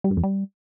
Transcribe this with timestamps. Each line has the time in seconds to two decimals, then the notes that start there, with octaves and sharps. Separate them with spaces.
0.04 G3
0.11 G2
0.17 F2
0.23 G3